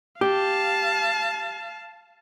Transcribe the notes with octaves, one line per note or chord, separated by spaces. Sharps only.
G4 F5 A5